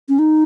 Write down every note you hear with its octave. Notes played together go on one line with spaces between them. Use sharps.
C#4
D#4